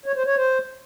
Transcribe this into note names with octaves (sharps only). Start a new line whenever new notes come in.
C#5
C5
C#5
C5